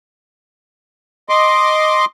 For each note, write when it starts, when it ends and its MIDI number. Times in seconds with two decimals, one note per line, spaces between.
1.29 2.05 75
1.29 2.05 84
1.29 2.05 86